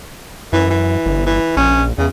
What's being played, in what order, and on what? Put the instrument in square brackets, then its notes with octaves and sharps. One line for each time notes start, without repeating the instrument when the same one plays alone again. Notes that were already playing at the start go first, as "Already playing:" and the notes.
[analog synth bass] F#2 [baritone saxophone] E3
[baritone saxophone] E3
[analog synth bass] G1
[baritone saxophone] E3
[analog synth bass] A#1 [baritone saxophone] C#4
[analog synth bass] E2 [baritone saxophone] C#3